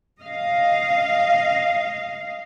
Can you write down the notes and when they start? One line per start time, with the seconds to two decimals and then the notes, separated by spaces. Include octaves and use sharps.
0.21 D#5 F5